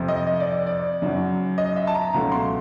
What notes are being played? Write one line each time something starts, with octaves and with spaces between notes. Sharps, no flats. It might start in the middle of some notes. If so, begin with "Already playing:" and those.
Already playing: F2 C3 F3
D#5
D#5
D5
D5
F#2 C#3 F#3
D#5
E5
A5
A#5
C#2 B2 F#3 A3 C#4 A#5
C6